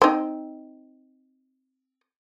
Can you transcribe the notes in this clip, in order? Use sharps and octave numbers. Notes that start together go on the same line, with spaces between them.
C4 D#4